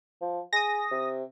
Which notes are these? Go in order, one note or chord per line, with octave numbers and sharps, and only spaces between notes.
F3
G#4 D#6 A#6
C3